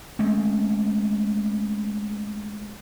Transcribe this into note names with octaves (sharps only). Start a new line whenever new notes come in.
G#3 A3 C4 C#4